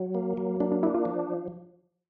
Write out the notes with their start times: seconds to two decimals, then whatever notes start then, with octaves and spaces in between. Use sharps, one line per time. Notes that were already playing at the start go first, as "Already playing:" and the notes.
Already playing: F#3
0.15 A#3
0.37 F#3
0.60 A#3 D4
0.72 D4
0.83 D4 E4
0.94 F4
1.05 F3